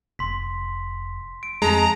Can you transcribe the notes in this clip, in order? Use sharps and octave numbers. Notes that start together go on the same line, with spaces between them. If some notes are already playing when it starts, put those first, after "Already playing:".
F1 C6 B6
D7
F2 G#3 A5 A#5